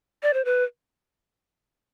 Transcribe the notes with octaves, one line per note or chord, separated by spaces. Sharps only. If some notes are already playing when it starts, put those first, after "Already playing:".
D5
C5
B4